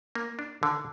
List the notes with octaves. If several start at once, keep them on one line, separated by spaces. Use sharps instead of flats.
A#3
D4
D3